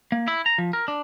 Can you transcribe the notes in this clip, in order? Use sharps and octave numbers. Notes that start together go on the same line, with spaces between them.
A#3
E4
A#5
F3
A#4
D4